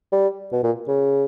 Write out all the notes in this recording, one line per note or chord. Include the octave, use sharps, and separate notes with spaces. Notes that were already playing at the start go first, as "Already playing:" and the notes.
G3
B2
A#2
C#3